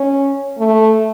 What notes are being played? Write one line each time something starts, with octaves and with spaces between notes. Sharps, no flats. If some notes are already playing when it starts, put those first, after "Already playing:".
Already playing: C#4
A3